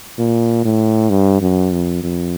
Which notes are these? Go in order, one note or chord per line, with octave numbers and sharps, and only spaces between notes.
A#2
A2
G2
F#2
F2
F2